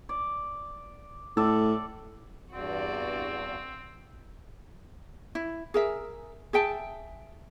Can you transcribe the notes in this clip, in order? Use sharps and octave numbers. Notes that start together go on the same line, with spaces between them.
D5
A2 A4 D5
E2 G2 C4 F#4 D5
E4
G#4 A#4 E5
G#4 E5 G5 A5